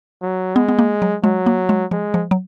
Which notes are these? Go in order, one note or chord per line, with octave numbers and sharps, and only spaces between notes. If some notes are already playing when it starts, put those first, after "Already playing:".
F#3
G#3 B3
B3
A#3
F#3
F#3 G#3
A#3
G#3
F3 G#3
F3
F#3